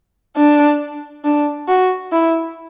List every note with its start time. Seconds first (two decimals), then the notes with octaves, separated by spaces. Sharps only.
0.37 D4
1.24 D4
1.69 F#4
2.12 E4